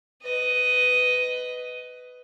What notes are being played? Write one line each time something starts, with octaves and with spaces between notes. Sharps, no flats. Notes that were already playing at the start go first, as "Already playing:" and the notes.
B4 D#5